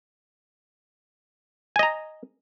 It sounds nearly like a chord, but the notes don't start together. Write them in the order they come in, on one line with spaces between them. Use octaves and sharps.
G#5 D#5 A#5